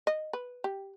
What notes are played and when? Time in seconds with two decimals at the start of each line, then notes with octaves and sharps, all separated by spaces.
0.07 D#5
0.33 B4
0.64 G4